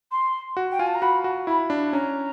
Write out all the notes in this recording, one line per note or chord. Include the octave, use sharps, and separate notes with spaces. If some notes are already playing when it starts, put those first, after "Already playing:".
C6
F#4
G5
F4 G#5
A5
A#5
F#4 B5
F#4
E4 B5
D4
C#4 A#5